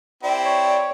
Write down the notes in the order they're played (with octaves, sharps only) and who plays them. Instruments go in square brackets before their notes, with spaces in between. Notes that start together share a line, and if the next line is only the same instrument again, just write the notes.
[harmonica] C4 E4 G4 [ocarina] D5
[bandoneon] C#5